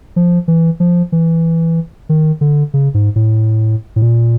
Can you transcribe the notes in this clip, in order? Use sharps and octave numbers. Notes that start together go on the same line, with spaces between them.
F3
E3
F3
E3
D#3
D3
C#3
G#2
A2
A2
A#2